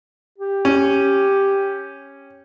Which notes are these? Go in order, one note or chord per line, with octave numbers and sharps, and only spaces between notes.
G4
C#4